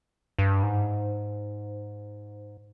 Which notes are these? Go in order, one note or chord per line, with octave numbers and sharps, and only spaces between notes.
G2
G#2